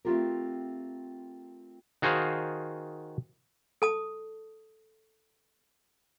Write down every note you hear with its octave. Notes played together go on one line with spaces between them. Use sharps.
A3 C4 C#4 F4 G4 A#4
D#3 F#4 G#4 C5 F5
A4 A5 D#6